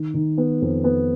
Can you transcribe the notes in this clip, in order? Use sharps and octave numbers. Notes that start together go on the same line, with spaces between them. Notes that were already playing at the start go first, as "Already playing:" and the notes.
Already playing: D#3
D#3
B3
F2
B3